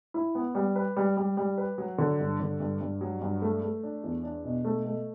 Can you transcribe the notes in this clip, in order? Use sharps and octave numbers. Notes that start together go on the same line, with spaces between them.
E4
B3
G3
B4
G3
G3
G3
B4
F#3
D3
G2
D3
G2
G2
F#3
G2
A3
A3
D4
E2
D4
B2
A3
A3